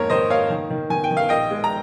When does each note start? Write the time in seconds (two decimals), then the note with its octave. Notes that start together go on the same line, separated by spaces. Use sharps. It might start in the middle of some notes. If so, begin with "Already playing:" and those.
Already playing: F2 G#2 A#3 A#4 C#5
0.10 D#3 C5 D#5
0.30 A#3 C#5 F5
0.50 D#3
0.70 D#3
0.90 D#3 G#5
1.04 G5
1.11 D#3
1.17 F5
1.29 A#1 D#5 G5
1.51 G#3
1.64 A#5